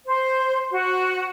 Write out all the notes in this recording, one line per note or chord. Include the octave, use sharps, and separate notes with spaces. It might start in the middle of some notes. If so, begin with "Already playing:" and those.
C5
F#4